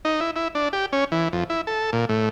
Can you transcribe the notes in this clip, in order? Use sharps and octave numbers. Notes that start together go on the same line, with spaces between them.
D#4
E4
E4
D4
G4
C#4
E3
F2
E4
A4
A#2
A2